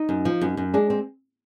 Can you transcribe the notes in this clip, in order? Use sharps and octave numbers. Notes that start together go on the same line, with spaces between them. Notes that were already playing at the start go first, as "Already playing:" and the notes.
Already playing: D#4
F#2
F3
F#2
F#2
G#3 D4
C4